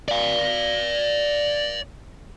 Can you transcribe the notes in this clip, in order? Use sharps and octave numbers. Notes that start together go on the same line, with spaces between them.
D5 F5